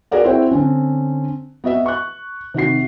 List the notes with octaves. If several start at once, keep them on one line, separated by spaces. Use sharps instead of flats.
F#4 G#4 A#4 B4 D5 F#5
C4 E4 F#4 G#4 C5 G5
D3 C4 C#4
B3 F#4 D#5 E5
C#6 F#6
C3 D#3 F#4 C7